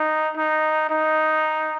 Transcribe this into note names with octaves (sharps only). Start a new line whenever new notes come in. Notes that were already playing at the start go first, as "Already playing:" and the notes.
Already playing: D#4
D#4
D#4